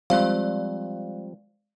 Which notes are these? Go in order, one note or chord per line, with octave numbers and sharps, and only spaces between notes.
F3 G3 G#3 C4 D5 F5